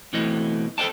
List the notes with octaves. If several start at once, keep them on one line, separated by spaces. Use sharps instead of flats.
B1 B2 E3 A3 C4 D#5
A4 B4 C5 D#5 G5 A5